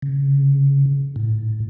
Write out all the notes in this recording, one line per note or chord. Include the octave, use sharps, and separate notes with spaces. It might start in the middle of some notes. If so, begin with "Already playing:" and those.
C#3
A2